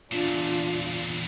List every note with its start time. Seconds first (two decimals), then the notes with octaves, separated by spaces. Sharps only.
0.11 E2 A#2 D4 F4